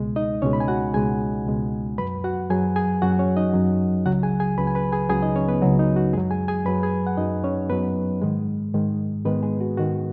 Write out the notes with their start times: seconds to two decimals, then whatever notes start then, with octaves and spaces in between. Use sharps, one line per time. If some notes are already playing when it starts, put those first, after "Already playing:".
Already playing: C#2 B2 G#3
0.16 D#4 D#5
0.42 C#2 B2 G#3 C#4 C#5
0.53 B5
0.60 G#5
0.68 F#4 F#5
0.94 C#2 B2 G#3 G#4 G#5
1.46 C#2 B2 G#3
1.98 F#2 F#3 B4 B5
2.24 F#4 F#5
2.50 F#2 F#3 G#4 G#5
2.76 G#4 G#5
3.02 F#2 F#3 F#4 F#5
3.19 C#4 C#5
3.37 D#4 D#5
3.54 F#2 F#3
4.06 C#2 C#3 F#3 F#4 F#5
4.23 G#4 G#5
4.40 G#4 G#5
4.58 C#2 C#3 F#3 B4 B5
4.67 G#5
4.75 B4 B5
4.92 G#4 G#5
5.09 C#2 C#3 F#3 G#4 G#5
5.22 D#4 D#5
5.36 C#4 C#5
5.48 B3 B4
5.62 C#2 C#3 F#3 F#4
5.79 D#4
5.96 F#4
6.13 F#2 F#3 G#3 G#4
6.31 G#4 G#5
6.48 G#4 G#5
6.65 F#2 F#3 B4 B5
6.83 G#4 G#5
7.07 F#5
7.17 F#2 F#3 D#4 D#5
7.44 C#4 C#5
7.69 F#2 F#3 B3 B4
8.22 G#2 D#3 G#3
8.74 G#2 D#3 G#3
9.25 G#2 D#3 G#3 B3 B4
9.42 G#3 G#4
9.60 F#4
9.77 G#2 D#3 G#3 F#4